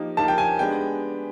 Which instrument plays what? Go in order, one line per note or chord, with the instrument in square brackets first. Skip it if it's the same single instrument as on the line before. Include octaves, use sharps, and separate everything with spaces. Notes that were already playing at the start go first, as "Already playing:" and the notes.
Already playing: [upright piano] F3 A#3 D#4 G4 A#4
[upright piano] F3 A#3 D#4 G4 A#4 [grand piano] A5
[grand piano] G5
G#5
[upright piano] G#3 B3 D4 G4 [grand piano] G5